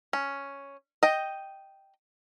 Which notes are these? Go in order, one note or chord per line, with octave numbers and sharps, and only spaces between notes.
C#4
D#5 G5